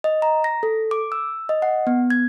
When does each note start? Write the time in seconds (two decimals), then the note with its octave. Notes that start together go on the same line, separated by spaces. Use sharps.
0.04 D#5
0.22 A#5
0.44 A#6
0.63 A4
0.91 D6
1.12 E6
1.49 D#5
1.62 F#5
1.87 B3
2.10 G#6